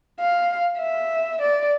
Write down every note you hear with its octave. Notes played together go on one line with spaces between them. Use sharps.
F5
E5
D5